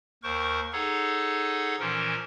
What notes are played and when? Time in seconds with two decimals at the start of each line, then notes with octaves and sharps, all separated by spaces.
0.23 D#2 A#4 C5 C#6
0.73 D#4 G#4 A4 C#5 F#5
1.80 A#2 E3 F3 C#4 A#4